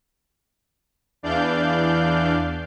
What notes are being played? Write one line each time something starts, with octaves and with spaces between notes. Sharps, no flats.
E2 E3 D4 D5 F5 G6